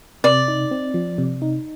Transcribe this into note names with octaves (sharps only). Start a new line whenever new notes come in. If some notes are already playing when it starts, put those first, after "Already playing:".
C3 D5
D#4
C4
F3
C3
D#4